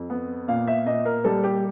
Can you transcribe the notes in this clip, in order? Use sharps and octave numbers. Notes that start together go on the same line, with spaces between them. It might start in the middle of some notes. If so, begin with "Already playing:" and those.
Already playing: F2
B3
A#2 F5
E5
A#2 D#5
A#4
G3 A4
G4